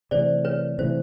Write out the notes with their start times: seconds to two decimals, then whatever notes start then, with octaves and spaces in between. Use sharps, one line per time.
0.11 C3 E3 A3 C5 D5
0.45 B4 C#5
0.78 C3 E3 A3 C5